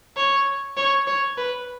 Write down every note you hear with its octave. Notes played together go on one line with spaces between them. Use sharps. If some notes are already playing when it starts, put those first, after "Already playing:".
C#5
C#5
C#5
B4